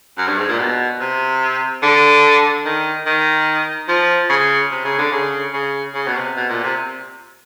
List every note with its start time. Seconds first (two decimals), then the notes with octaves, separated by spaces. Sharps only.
0.18 F#2
0.28 G2
0.38 G#2
0.49 A#2
0.59 B2
1.00 C3
1.82 D3
2.65 D#3
3.06 D#3
3.88 F3
4.29 C#3
4.71 C3
4.85 C#3
4.99 D3
5.12 C#3
5.53 C#3
5.94 C#3
6.07 B2
6.16 C3
6.36 B2
6.49 A#2
6.64 C3